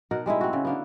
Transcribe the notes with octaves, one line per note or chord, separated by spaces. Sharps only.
B2 D#4 A#4 F#5
G3 G#3 D#4 E4
C4 F#4
C#3
D3 A#3 B3